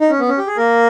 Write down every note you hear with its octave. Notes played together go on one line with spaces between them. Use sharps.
D#4
C#4
B3
C#4
G4
G#4
A#3 A#4